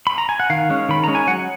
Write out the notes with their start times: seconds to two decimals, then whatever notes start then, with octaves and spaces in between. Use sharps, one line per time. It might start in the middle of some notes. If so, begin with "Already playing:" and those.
0.07 B5
0.18 A#5
0.29 G#5
0.40 F#5
0.50 D#3 F5
0.69 G#3 C#4
0.89 D#3 B5
1.04 G#3 C#4 A#5
1.15 G#5
1.27 F#3 F#5